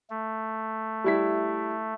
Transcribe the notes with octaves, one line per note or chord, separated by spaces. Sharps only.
A3
G3 E4 B6